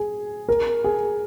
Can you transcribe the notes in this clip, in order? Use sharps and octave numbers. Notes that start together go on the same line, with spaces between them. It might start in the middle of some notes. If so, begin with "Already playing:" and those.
Already playing: G#4
A#4
G#4